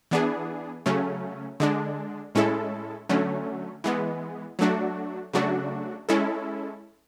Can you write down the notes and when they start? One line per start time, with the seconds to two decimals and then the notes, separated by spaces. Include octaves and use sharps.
0.11 E3 B3 D4 G#4
0.86 C#3 F#3 A3 C#4
1.60 D3 G#3 D4
2.35 A2 G#3 C#4 E4 A4
3.09 D3 F#3 A3 C#4
3.84 E3 G#3 B3
4.59 F#3 A3 D4 F#4
5.33 C#3 F#3 A3 D4 F#4
6.09 G#3 C#4 E4 A4